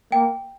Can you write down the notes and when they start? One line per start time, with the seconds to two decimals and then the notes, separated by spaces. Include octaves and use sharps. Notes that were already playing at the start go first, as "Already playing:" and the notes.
0.12 A#3 G5